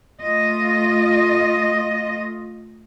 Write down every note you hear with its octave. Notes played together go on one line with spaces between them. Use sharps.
A3 F4 D#5